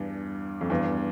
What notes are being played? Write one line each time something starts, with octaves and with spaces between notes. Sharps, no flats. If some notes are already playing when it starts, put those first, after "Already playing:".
Already playing: E2 G2
F2
E2 G2